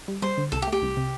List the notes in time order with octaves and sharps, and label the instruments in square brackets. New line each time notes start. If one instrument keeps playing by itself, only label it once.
[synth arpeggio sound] G3
[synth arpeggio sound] G3 [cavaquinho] C5
[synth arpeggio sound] D3
[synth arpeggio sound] C2 [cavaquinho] A4
[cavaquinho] G4
[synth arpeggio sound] A3
[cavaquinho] G4
[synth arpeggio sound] C2
C3